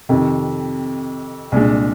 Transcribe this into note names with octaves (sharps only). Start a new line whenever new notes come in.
F2 C3 D#3
C2 A#2 G#3 D4